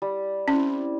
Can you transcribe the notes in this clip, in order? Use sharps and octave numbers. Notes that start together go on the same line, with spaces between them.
G3
C4 C#4 E4